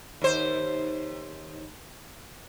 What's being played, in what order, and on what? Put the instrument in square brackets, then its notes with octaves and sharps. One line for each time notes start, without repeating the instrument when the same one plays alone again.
[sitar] D#2 C5